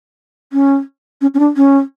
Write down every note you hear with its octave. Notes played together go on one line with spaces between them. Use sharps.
C#4
C#4
C#4
D4
C#4